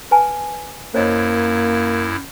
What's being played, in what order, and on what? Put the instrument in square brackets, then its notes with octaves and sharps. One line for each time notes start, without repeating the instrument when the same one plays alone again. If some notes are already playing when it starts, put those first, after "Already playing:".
[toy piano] B4 G#5 A5
[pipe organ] F#2 E4 [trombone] A#3 [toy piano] C5 C#5 D#5